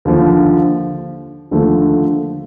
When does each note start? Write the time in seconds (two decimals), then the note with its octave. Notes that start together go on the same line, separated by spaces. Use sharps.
0.05 D#2 D3 F3
1.51 D#2 D3 F3 A3